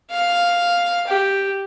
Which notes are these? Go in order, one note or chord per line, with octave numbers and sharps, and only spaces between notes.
F5
G4